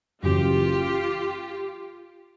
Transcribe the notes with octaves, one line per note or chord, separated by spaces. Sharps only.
F#1 F#2 C#3 E3 F4 G4